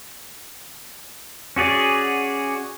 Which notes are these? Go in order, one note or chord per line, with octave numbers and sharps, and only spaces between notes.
C#4 F#4 G#4 D5